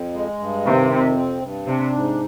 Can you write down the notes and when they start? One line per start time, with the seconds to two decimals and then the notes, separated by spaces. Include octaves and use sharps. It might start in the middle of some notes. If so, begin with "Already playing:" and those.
Already playing: F2
0.14 G#3
0.39 G2
0.65 C3 D#3
0.90 F2
1.16 C4
1.41 G2
1.67 C3 D4
1.92 G#2